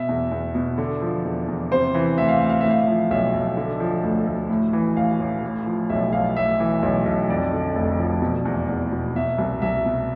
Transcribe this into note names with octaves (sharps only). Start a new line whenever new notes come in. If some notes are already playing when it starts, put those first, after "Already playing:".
Already playing: B2 E5
E2
E2
B2
D3
F3
E2
E2
C3 C5
E3
D2 E5
F5
D2 E5
F5
A2 E5
F5
E5
F3
B1 E5
B1
D3
F3
D2
D2
A2
E3
A1 F5
A1
A2
F3
B1 E5
B1 F5
A2 E5
E3
B1
B1
F2 D5
D3
F1
F3
B2
E2
E2
B2
B2 E5
C2
C2 E5
B2